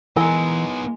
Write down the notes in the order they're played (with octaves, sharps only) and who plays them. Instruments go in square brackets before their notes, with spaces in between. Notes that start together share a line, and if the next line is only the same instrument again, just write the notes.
[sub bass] E3 [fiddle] G#3 [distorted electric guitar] B3 D#4 [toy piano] E4 A#4 G#5